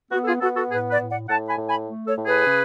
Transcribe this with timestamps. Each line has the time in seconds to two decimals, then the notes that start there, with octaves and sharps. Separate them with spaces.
0.12 B3 F#4
0.22 A4
0.27 F4 G#4
0.41 B3 F#4 A4
0.56 F#4 A4
0.70 A2 G#4 B4
0.90 B4 D5
1.00 A2
1.09 D5 F#5
1.29 A2 F#5 A5
1.48 G#5 B5
1.58 A2
1.68 G#5 B5
1.88 A3
2.07 A4 C#5
2.17 A2
2.26 G#4 B4
2.46 C#3